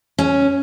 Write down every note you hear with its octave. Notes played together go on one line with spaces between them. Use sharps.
C#4